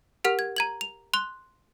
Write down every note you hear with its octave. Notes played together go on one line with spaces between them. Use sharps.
G4 A#4 F#5 F6 F7
G#6
A#5 G#6 F#7
F7
C6 F#6 G7